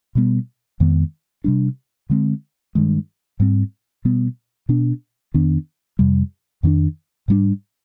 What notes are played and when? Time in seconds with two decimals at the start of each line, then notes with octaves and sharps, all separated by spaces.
0.15 B2 G3 B3
0.80 F2 D#3 G#3 B3
1.44 C3 G3 D4
2.10 D3 G#3 C4
2.75 G2 D#3 G#3
3.40 G#2 G3 C4
4.05 B2 G3 B3
4.69 B2 B3 D4
5.34 F2 D#3 B3 D4
5.99 F2 C3 G3
6.63 F2 D#3 B3 D4
7.28 G#2 G3 B3 D4